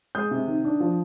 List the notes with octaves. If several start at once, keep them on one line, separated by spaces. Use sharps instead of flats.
G#3 D#6 G6
C3
D#3
D4
F3